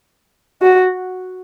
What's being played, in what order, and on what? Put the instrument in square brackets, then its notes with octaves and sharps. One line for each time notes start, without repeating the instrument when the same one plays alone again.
[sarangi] F#4